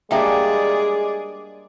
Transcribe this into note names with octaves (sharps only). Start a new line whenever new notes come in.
G3 G#3 A#3 D4 G#4 D5 E5 G5